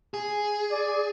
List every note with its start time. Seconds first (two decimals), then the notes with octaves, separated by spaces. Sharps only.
0.14 G#4
0.71 D5